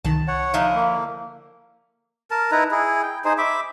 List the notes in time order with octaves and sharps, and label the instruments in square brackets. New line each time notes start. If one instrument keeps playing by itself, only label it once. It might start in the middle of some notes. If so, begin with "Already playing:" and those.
[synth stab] C2 D#3 [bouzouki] A5
[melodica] C#5 F#5
[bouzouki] D3 F3 E4 [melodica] D#4
[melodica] A#3
A#4 A5
D#4 E4 B4 A#5
E4 G#4
G5
D#4 G#4 C5
E5 B5 D6